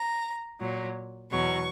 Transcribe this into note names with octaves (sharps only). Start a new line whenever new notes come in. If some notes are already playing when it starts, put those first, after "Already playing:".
Already playing: A#5
A#2 F#3
E2 B2 F#3 C#6